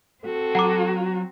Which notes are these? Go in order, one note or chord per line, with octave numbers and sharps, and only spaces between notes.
C4 F#4 A4
F#3 F#5 A#5 D6